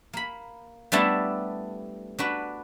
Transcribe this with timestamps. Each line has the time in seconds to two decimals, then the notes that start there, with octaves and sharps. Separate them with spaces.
0.13 A#3 B5
0.92 G3 A3 B3 D4 E4 A5
2.19 D4 F#4 B4